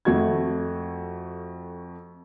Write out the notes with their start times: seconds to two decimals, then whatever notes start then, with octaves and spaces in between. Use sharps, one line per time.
0.05 F2 A3 F#4 G#6